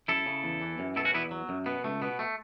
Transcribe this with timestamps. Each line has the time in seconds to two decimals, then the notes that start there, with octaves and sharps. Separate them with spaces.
0.08 F#2 E4 A4
0.26 C#3
0.44 E2
0.61 E3
0.79 F#2
0.96 B2 E4 A4
1.05 C#4 F#4
1.14 E2 B3 E4
1.31 F#3
1.49 F#2
1.66 B2 B3
1.84 C#2 A3
2.02 B2 B3
2.19 A3